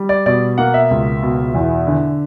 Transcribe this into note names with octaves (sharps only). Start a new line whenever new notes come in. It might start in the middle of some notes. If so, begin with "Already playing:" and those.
Already playing: G3
D5
B2 D5
A#3 F#5
E5
C#2
B2
E2
D3